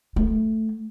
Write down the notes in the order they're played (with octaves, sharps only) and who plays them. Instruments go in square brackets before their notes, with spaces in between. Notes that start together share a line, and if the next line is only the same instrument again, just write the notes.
[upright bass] A3